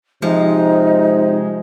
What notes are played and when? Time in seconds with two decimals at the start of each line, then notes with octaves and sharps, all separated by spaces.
0.22 C3 F3 G#3 D#4